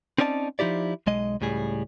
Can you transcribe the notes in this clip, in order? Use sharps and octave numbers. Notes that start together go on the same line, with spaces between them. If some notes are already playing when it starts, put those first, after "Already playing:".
C4 C#4 D#4 D5 G#5 A5
F3 D#4 E4 G4 D5
B1 G#3 D#5
C#2 A2 G3 G#4